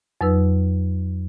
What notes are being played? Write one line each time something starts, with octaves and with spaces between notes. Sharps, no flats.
F2 F#3 D#4 B4 E6